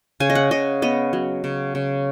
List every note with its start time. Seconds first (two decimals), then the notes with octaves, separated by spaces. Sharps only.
0.20 C#3 G#5
0.30 D#5
0.35 F#5
0.51 C#3 D#5
0.82 B3 D#5
1.13 F#3
1.44 C#3
1.75 C#3